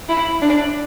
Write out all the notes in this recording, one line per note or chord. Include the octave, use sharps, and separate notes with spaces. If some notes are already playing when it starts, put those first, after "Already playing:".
E4
D4